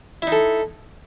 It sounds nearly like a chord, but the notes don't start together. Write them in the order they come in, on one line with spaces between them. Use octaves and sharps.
E4 D#4 A4